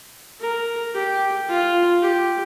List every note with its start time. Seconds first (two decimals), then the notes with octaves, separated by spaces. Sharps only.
0.41 A#4
0.95 G4
1.49 F4
2.03 G4